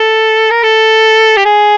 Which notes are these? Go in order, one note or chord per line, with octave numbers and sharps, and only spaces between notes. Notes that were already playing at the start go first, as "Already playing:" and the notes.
Already playing: A4
A#4
A4
G4
G#4